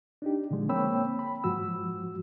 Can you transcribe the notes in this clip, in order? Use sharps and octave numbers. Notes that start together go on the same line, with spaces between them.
D4 D#4 G4
A#2 D3 F3 G#3
A#3 C4 C#5 G5 B5 E6
B5
G#2 F3 F#4 E6